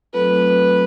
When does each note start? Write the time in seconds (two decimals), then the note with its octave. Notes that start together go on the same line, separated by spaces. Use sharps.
0.13 F#3 A3 C4 F4 A4 B4